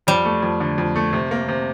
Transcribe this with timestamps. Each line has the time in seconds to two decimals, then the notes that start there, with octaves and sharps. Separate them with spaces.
0.07 F2 G3
0.25 A3
0.43 F2
0.60 D3
0.78 F2
0.96 A3
1.13 C3
1.31 A#3
1.48 C3